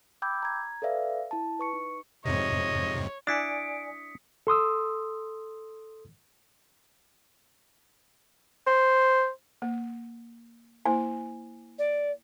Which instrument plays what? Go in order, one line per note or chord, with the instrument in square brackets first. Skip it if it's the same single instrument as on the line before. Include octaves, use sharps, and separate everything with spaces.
[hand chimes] G5 B5 D6 E6 G6 G#6
A#5 G#6
A4 B4 D5 E5 F5
E4 A5
B4 C#6 C#7
D#4
[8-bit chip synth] F2 G#2 C3 [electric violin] C#5 [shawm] D#5
[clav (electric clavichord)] D4 E4 [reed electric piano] D5 G#5 [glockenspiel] D#6 B6 C#7 [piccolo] D7
[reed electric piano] A4 C6 D#6 E6
[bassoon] C5
[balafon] A#3
[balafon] A#3 E4 C5 [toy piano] G#5
[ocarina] D5